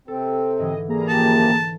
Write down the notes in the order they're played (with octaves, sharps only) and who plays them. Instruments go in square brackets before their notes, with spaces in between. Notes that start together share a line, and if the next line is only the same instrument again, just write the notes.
[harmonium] C3 C4 [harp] A4
[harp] G#2 D3 E3 [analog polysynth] D#5
[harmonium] G3 [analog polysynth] A#3 G#4 A#5
[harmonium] F#2 F3 G4 [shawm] A5